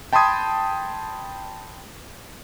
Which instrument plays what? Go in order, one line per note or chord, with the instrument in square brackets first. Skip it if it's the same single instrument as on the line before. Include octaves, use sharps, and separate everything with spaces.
[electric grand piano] G5 A5 B5 C6 D#6 G#6